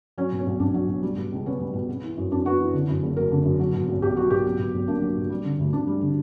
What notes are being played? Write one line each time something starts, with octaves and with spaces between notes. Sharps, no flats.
F#3 C#4
B2
C#4
B1
B1 D4
F#3
B2
G3
B2
C#2
B3 C#4
G3
B2
B3
E3
F#2
F#2 D4
B3 F#4
E3
D3
F#2
F#1
F#3 A#4
D3
F#2
F#3
B2
B1
B1 G4
F#3 F#4
B2 G4
F#3
B2
B1
A#3 D4
F#3
B2
G3
D3
D2
D2 D4
G3
D3